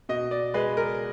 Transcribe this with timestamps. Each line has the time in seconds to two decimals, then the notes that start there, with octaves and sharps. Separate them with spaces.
0.09 B2 D#5
0.31 D5
0.54 G#3 B4
0.77 A#4